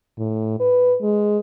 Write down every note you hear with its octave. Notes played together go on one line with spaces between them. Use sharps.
A2
B4
G#3